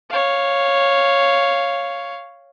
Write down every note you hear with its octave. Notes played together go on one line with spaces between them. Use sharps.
C#5 F5